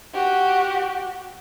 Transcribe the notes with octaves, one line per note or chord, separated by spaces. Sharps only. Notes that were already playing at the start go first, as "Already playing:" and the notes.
F#4 G4